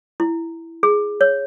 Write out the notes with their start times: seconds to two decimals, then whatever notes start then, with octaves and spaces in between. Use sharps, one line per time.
0.20 E4
0.83 G#4
1.21 C#5